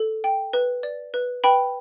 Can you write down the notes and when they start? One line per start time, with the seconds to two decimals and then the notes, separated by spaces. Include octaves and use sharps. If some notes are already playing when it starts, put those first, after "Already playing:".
Already playing: A4
0.24 G5
0.53 B4
0.83 D5
1.14 B4
1.44 B4 G5 B5